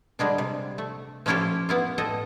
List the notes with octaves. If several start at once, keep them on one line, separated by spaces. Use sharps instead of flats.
D3 G3 G#3 D4
C3
A3
F3 A3 C#4 E4 F4 G4
B3 E4 F4
A2 A4 D#5